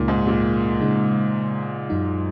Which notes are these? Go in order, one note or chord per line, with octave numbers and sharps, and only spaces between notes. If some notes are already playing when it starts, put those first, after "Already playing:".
Already playing: C#2 A#2 C#3 G#3 D#4 A#4
G#2
A#2
C#3 G#3 D#4
F#2 F#3 D#4